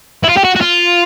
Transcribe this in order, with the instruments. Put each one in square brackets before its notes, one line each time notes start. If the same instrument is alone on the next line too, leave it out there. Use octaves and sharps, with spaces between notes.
[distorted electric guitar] E4
F4
G4
F#4
F#4
F4